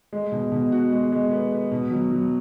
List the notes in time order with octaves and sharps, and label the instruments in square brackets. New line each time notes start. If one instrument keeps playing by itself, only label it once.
[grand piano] G#3
B2
B2
F#4
G#3
G#3
B3
B3
B2
F#3
F#3